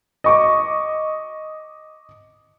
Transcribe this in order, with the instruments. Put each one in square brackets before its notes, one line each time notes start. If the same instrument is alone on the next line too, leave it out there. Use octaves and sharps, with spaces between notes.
[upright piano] D#5 C#6 D6